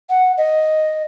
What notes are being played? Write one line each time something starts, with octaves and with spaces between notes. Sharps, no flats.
F#5
D#5